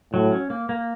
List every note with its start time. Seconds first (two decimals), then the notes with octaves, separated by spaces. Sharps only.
0.13 A2 F#3
0.32 C#4
0.50 A#3
0.69 A#3